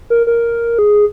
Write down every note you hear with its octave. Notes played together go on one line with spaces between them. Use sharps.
A#4
A#4
G#4